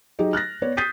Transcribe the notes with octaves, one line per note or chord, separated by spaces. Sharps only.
F#3 D#4 G4 G#4 D#5
F6 F#6 A6 A#6
B3 C#5 D5
D#6 G6 A6 B6 C7 D#7